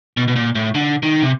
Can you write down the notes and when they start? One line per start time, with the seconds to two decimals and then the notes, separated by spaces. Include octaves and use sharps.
0.17 B2
0.28 B2
0.36 A#2
0.55 A2
0.75 D3
1.03 D#3
1.22 C3